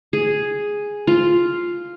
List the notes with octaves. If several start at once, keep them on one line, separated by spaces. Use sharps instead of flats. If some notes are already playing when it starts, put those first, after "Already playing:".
G#4
F4